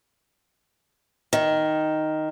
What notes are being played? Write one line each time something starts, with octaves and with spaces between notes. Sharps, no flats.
D#3